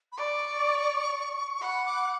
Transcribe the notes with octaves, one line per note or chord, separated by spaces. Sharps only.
B5
D5 C#6
F#5 B5
D6